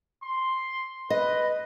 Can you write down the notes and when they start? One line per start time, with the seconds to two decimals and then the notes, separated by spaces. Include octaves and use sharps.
0.23 C6
1.10 B4 D#5